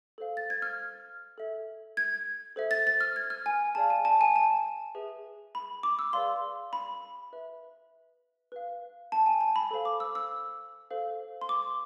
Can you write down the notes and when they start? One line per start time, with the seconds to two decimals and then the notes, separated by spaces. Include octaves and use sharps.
0.18 A4 C5 F5
0.37 A6
0.50 G#6
0.62 F6
1.38 A4 E5
1.97 G#6
2.56 A4 C5 E5
2.71 A6
2.87 A6
3.01 F6
3.16 G#6
3.30 F6
3.46 G#5
3.75 G#4 D5 F5 A5
3.90 G#5
4.05 A5
4.21 G#5
4.36 A5
4.95 G#4 B4 E5
5.55 B5
5.83 D6
5.99 E6
6.13 G#4 B4 D5 F5 C6
6.73 B5
7.33 B4 E5
8.52 B4 F5
9.12 A5
9.26 G#5
9.41 A5
9.56 B5
9.71 A4 C5 F5
9.85 D6
10.00 E6
10.15 E6
10.91 A4 C5 F5
11.41 C6
11.49 D6